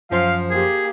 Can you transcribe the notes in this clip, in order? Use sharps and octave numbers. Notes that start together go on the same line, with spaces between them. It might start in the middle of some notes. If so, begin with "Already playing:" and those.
F#2 F3 C5 F5 C6
A#3 G4 G#4